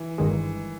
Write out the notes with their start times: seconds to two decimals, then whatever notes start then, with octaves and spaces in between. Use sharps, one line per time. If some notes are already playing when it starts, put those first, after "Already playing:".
Already playing: E3
0.18 G1 G2 D#3 G#3